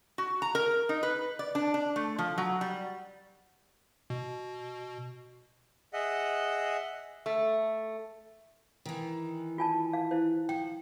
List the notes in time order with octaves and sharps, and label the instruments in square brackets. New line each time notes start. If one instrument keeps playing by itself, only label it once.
[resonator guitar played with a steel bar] F#4
A#5
A#4
D#4
B4
D5
D4
D4
A3
F3
F#3
G3
[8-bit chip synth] B2
[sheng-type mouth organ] G#4 D#5 E5 F#5
[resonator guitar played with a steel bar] A3
[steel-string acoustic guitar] D#3 E3
[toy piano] F4 G#5 A5
F5
E4 C5
[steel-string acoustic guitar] F3 [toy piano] G5